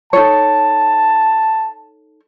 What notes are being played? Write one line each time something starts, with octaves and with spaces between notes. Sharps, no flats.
D#4 A4 C#5 A5